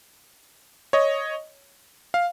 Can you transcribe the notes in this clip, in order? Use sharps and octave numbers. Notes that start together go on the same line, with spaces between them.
C#5 D#5
F5